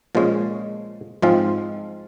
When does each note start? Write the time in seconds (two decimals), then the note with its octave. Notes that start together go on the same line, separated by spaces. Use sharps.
0.15 A#2 F3 G#3 C#4
1.22 G#2 F3 G#3 C4 F4